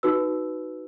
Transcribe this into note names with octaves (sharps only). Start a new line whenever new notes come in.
D#4 F#4 B4 E6